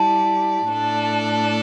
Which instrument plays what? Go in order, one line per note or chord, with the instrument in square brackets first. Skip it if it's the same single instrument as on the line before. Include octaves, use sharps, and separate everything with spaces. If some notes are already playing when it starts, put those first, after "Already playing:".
Already playing: [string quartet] G3 E4 G4 D5 [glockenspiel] A5
[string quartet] A2 A3 D4 A4 D5